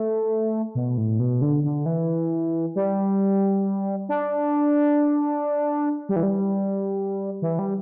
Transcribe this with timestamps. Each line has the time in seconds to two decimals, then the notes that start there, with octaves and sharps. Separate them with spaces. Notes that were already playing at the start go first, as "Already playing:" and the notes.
Already playing: A3
0.75 B2
0.98 A2
1.20 B2
1.42 D3
1.64 D3
1.86 E3
2.75 G3
4.09 D4
6.09 G3
6.16 E3
6.23 G3
7.42 E3
7.59 G3